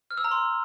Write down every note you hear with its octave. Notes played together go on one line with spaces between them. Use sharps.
F6
E6
A#5
C6